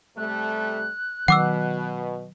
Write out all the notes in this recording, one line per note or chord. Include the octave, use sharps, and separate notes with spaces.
C3 G3 A3 F#6
B2 D#3 F#3 F#5 D6 E6